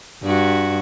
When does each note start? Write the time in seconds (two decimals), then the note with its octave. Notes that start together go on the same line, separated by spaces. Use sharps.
0.23 G2 F#4